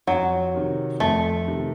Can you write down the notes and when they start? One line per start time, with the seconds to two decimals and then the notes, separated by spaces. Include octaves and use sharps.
0.07 F2 F#3
0.54 C3 D#3
1.00 F2 A3
1.48 C3 D#3